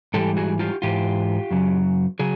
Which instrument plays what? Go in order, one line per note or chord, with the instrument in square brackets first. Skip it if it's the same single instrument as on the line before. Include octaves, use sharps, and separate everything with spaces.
[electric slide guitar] G#2 E3 G3 G4 A4
F#4 G#4
F4 G4
G#2 E3 F4 G4
F#2 C#3 F#3
C#3 F#3 G#4